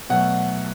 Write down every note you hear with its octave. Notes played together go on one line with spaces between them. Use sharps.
B2 F#3 A3 F#5